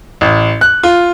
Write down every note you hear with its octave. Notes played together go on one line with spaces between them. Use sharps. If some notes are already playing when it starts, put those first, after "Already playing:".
A1
F#6
F4